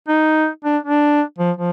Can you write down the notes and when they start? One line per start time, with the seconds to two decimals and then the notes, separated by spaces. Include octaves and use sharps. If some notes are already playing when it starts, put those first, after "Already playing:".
0.08 D#4
0.64 D4
0.83 D4
1.38 F3
1.57 F3